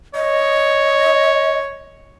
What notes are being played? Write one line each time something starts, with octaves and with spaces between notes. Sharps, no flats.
C#5 D#5